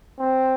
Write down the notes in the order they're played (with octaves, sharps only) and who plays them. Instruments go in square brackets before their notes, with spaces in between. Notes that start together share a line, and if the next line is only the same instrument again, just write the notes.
[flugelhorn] C4